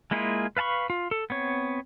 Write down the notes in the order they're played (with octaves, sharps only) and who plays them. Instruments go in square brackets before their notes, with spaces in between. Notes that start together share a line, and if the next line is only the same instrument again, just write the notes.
[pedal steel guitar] G#3 A#3 E4 F4 G#4
B4 F5 A5 B5 C#6
F4
A4
B3 C4 C#5